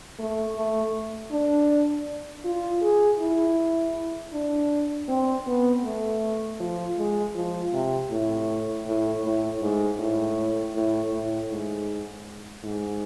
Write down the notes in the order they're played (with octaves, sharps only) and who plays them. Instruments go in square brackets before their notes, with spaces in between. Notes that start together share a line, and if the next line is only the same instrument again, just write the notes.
[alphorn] A3
A3
D4
F4
G#4
E4
D4
C4
B3
A3
F3
G#3
F3
C3
A2
A2
A2
G#2
A2
A2
A2
G#2
G#2